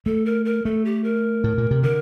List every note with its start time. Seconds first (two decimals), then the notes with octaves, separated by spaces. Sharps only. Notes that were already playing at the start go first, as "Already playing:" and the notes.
0.06 A3 A4
0.26 A#4
0.45 A#4
0.65 A3 A4
0.85 G4
1.04 A#4
1.44 A2
1.58 A#2
1.71 C3
1.83 D3 A#4